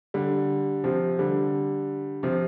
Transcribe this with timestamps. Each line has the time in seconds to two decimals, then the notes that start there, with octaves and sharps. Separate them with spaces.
0.14 D3 G3
0.84 C3 F3
1.19 D3 G3
2.23 C3 F3